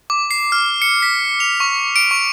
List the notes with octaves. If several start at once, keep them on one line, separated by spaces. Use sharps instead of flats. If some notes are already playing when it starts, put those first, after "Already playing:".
D6
C7
F6
C#7
B6
F7
C#6
D7
C#6